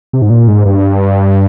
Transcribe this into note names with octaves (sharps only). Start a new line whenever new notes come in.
C3
G#2
A#2
G#2
G2